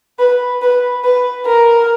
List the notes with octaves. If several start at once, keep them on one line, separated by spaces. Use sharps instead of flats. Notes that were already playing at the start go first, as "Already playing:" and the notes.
B4
B4
B4
A#4